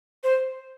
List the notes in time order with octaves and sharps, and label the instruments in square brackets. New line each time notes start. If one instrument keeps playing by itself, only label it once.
[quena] C5